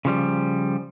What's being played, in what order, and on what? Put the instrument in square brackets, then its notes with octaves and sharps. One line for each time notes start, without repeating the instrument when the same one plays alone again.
[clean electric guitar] C#3 F3 G3